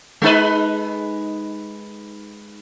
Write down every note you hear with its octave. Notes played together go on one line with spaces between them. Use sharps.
G#3 D#4 B4